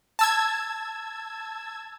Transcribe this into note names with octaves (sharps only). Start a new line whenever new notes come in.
A5 E6 G#6